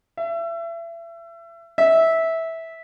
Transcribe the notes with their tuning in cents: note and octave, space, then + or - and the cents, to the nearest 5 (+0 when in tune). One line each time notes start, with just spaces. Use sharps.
E5 +30
E5 -15